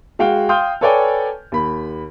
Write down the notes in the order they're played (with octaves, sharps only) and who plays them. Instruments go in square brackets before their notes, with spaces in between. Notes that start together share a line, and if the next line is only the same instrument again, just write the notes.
[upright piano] G#3 F#4 F5 G5
F5 G5 C6 D#6 F6 G6
A4 B4 C#5 D5 G5 G#5
D#2 B5